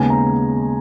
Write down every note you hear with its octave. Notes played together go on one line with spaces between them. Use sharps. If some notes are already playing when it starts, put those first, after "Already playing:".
Already playing: D#2 C#3 G#3 B3 G#5
A#5